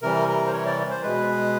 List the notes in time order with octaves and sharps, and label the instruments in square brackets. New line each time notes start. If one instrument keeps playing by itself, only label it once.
[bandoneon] C3 E3 G3 A#4
A#4
C5
C#5
D5
C5
B2 G#3 B4